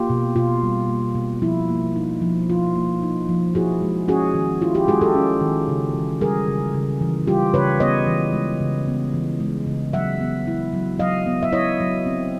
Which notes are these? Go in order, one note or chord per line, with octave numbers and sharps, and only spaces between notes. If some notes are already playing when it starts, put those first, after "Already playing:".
Already playing: A#3 F4 G4
B2
B2 F4
G3
A#3
B2
F3 E4
A#3
D#4
F3
F3 F4
A#3
D#4
F3
E4 F#4 G#4
G#3
C#4 F#4 G#4
D#3
E4 F4
F4 G4
G#3 F#4 G#4
G4 A4
C#4
D#3
C#3
E3
G3 G#4 A#4
C#3
C#3
E3
G3 F4 G4
C#3 B4 C#5
B3 C#5 D#5
E3
G#3
C#3
B3
E3
G#3
C#3
F#3 E5 F#5
B3
E4
F#3
F#3 D#5 F5
B3
E5
E4 C#5 D#5
F#3
C4